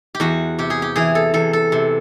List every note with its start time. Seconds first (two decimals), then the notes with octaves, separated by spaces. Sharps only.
0.15 G4
0.20 E2 F#4
0.59 C3 G4
0.70 G#4
0.82 G4
0.96 E3 G#4
1.15 A4
1.34 E2 A4
1.53 A4
1.72 C3